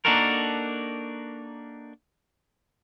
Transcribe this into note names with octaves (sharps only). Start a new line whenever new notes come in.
A#3 D4 D#4 F#4 A4 A#4